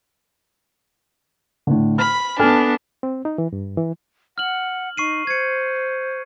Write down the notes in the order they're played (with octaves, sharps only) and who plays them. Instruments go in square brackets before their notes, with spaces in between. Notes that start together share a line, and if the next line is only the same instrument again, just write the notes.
[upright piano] A2 D3
[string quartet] B5 [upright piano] F6
[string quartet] B3 D4 [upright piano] A4 G#5 F6
[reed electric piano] C4
D#4
E3
G2
E3
[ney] F#5 [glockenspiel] F6 F#7
[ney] D#4 [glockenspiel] C#6 C7 D#7
[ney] C5 [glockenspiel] G#6 C#7